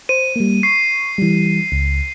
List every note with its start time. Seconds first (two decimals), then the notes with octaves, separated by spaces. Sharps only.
0.09 C5 D#7
0.36 G3 A#3
0.63 C#6 C7
1.18 E3 G3
1.72 C#2